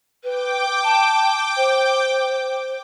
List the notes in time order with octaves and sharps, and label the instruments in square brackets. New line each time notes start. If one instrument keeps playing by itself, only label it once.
[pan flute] B4 [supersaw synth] G5 D6
[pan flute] A5
C5